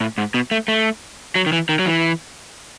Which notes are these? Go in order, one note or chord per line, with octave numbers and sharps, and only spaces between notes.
A2
G#2
B2
A3
A3
F#3
D#3
E3
D#3
F#3
E3